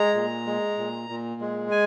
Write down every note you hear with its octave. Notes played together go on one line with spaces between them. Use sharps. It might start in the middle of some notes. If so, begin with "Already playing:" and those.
Already playing: G#3 A#5
A#2
G#3
A#2
A#2
G#3
G#5